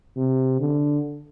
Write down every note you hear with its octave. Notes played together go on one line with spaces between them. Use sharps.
C3
D3